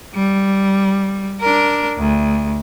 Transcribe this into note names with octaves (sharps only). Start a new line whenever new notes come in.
G3
D4 A#4
D2